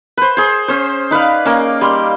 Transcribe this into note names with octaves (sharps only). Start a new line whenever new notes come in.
B4 C5
G#4 C5
C#4 C5
D#4 B4 D5 F5
A#3 C#4
G3 C6